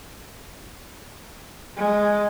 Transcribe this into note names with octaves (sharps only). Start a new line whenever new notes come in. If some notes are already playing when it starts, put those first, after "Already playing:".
G#3